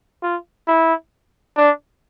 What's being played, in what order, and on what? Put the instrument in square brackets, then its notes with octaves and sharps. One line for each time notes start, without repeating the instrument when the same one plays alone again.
[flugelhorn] F4
E4
D4